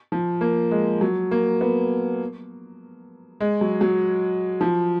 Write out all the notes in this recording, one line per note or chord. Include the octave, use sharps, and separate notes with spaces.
F3
A#3
G#3
F#3
A#3
B3
G#3
F#3
F#3
F3